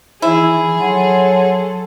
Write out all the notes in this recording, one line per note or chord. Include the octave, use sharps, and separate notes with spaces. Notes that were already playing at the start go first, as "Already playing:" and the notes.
D#3 E3 E4 G#4
F#3 A4 C#5 F#5 C6